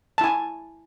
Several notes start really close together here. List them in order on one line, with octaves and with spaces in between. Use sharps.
A5 E4 G#5